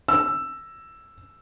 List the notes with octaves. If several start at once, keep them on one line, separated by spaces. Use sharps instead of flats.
E6